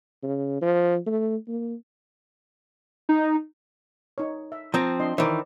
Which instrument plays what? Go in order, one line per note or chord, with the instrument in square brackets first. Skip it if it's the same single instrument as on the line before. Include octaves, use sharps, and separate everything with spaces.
[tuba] C#3
F3
A3
A#3
[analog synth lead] D#4
[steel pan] D#4 C#5
E5
[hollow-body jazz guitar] F3 C4 [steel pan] A#5
[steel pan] D4 D#5 C6
[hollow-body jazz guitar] D#3 E3 [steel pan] C5 D5